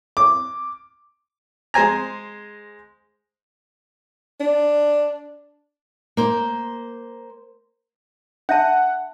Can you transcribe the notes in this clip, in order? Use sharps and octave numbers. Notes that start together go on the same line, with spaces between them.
D6
G#3 C5 G#5 A#5
D4
A#3 C5
D4 E5 F#5 A5